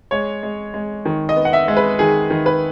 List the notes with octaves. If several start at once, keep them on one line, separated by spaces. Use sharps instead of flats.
G#3 C#5
G#3
G#3
D#3
D#5
B3
F#5
E5
G#3
B4
D#3 G#4
D#3
B4